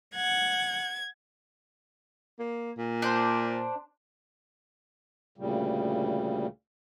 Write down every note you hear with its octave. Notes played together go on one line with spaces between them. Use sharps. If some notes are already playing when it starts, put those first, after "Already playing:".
F#5 G#6
A#3
A#2
D4 C5
D2 A#2 C#3 G3